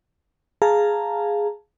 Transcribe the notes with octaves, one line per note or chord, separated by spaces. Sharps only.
G#4 F5 A5 A#5